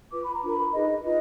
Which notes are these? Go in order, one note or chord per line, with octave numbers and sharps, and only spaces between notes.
F4 B4 D6
B5
A#5
D4 F4 A#4 B5
D#4 G#4 B4 D#5
F4 B4 D#5